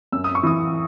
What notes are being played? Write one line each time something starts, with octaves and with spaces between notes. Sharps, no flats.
F#2 E6
D#6
C#6
E3 D#6